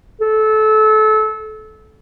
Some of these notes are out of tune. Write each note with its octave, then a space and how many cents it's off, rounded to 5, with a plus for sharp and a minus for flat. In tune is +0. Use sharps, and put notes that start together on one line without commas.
A4 -25